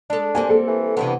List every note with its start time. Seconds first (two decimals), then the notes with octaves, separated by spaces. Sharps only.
0.10 G#3 D4 A4
0.35 G3 A#3 C4 G#5
0.49 A4
0.67 E3
0.97 G2 C3 E3 B3